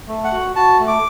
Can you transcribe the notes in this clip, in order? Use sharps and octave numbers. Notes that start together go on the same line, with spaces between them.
A3
F#5
F#4
F#4 A5
A3
D6